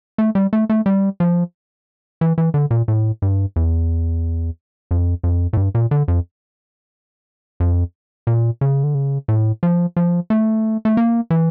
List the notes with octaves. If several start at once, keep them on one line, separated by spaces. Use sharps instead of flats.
A3
G3
A3
A3
G3
F3
E3
E3
D3
A#2
A2
G2
E2
F2
F2
A2
G2
A#2
D3
F2
F2
A#2
C#3
D3
C#3
A2
F3
F3
A3
A3
A#3
E3